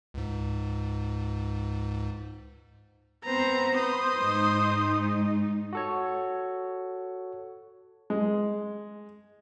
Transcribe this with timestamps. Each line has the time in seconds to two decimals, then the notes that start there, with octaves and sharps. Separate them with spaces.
0.14 C#2 G#2
3.25 B3 C4 B4 C5 A#5
3.78 B4 C5 D#6
4.21 G#2 D#4
5.73 F#4 A4 C#5
8.10 G#3